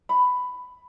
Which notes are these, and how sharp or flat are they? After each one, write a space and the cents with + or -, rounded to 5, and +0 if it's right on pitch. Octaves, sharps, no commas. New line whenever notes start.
B5 +10